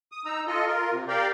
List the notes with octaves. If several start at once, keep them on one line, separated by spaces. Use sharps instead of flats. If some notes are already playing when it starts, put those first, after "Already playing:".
D#6
D#4 A#5 E6
F4 A4 D#5
F4 A#4
C3
G4 A#4 D5 F5 G5